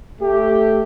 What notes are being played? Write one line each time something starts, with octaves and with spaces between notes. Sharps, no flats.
A3 G4